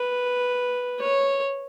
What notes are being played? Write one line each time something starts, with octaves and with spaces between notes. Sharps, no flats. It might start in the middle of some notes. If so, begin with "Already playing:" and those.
Already playing: B4
C#5